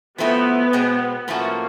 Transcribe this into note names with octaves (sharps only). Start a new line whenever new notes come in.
F3 A3 B3 C4 E4
B2 G#3 C4
A2 F3 A3 A#3 C#4 F#4